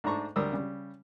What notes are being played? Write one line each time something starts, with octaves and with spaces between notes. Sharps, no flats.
G#2 A3 D4 A#5 C#6
D2 G3 A#4 D#6 E6
C#3 G3